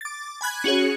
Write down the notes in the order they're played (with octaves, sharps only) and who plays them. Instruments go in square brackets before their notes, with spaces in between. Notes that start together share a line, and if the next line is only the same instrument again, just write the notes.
[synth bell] D6 A6
G#5 B5 F#6 G#6
C#4 F#4 G#4 C#5